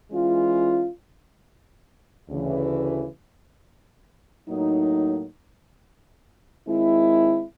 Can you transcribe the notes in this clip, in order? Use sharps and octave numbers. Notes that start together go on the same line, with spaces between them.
E3 G#3 C#4 F4
D2 C#3 E3
A2 F#3 A#3 D#4
D#3 G#3 C4 E4